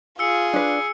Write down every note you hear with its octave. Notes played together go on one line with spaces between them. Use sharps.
F4 G#4 E6 C#7
D4 B4